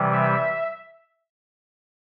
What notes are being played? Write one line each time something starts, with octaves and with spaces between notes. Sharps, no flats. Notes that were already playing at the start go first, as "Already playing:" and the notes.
Already playing: C3 E3 G3
E5